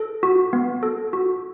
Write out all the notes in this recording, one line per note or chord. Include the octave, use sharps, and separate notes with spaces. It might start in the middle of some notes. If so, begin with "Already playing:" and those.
Already playing: A4
F#4
B3
A4
F#4